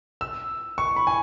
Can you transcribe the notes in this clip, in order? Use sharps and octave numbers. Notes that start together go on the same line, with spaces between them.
E6
C#6
B5
G#5